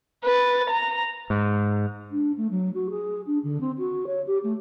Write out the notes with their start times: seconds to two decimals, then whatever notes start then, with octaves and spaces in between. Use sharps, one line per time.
0.24 B4 A6
0.70 A#5
1.30 G#2
2.11 D4
2.37 A3
2.50 F#3
2.74 F#4
2.90 G#4
3.26 D4
3.43 D3
3.60 C4
3.78 F#4
4.06 C#5
4.26 G4
4.43 A3